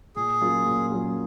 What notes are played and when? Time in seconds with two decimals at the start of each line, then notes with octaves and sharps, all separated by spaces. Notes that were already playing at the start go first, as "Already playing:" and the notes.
0.16 A#2 G#4
0.41 F#3 A#3 C#4 F4
0.66 A#2
0.91 F#3 A#3 C#4 F4